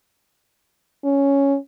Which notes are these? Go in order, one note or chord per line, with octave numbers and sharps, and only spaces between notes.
C#4